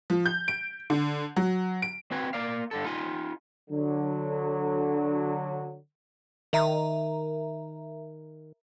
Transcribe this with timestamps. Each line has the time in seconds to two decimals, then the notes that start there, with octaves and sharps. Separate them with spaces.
0.10 F3
0.26 G6
0.48 D7
0.90 D3
1.36 F#3
1.82 D7
2.11 C4 F#4 B4 G#5
2.33 A#3 D5 F5
2.71 G2 D3 A4
2.85 D#4 F4 G#5
3.70 D3 F#3
6.53 D#3 A#4 E5 A#5